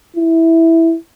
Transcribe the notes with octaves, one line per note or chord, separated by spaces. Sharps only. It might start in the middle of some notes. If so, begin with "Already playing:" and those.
E4